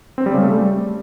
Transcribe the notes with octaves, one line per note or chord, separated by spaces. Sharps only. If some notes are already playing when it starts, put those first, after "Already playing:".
C4
G3
C#3
A3
G3